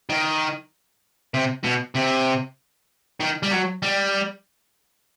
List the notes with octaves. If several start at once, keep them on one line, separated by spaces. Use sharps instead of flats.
D#3
C3
B2
C3
D#3
G3
F#3
G3